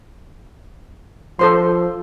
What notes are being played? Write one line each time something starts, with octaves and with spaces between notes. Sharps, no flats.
F3 A4 C5 C6